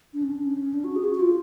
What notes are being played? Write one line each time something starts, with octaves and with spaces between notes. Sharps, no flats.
D4
C#4
D4
C#4
D4
F#4
G#4
F#4
F#4
F4